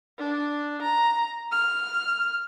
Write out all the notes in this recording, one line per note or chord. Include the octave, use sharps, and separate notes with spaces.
D4
A#5
F6